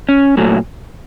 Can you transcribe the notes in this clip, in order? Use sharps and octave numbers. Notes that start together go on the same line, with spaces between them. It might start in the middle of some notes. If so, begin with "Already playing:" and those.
C#4
A#2 F#3 A3